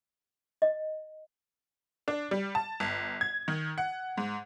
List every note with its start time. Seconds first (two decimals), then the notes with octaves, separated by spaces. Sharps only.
0.62 D#5
2.08 D4
2.31 G3
2.55 A5
2.80 G1
3.21 G#6
3.48 D#3
3.78 F#5
4.17 G#2